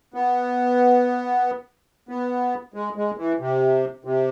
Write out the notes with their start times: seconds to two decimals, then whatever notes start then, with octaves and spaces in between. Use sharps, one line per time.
0.14 B3
2.09 B3
2.74 G#3
2.96 G#3
3.18 E3
3.40 C3
4.05 C3